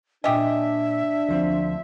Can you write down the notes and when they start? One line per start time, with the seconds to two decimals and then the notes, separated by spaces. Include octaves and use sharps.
0.24 A#2 D4 G4 D#5 E5 G#5
1.28 D2 F3 C4